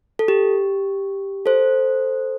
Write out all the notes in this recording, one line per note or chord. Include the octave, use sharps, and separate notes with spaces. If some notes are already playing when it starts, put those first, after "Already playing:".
A4
G4
A4 C5